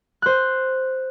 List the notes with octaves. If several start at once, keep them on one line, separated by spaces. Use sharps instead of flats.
C5 F#6